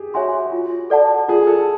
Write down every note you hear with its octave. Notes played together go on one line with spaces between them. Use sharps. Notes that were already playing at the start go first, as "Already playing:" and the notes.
Already playing: G4 G#4
F#4 C#5 E5 G#5 C6
F4
A4 D5 F#5 A5
F4 G#4
A4